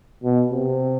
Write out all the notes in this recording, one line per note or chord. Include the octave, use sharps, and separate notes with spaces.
B2
C3